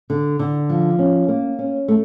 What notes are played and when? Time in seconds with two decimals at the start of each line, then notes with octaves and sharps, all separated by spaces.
0.10 D3
0.39 D3
0.69 F3
0.99 C#4
1.28 A#3
1.59 C#4
1.88 A3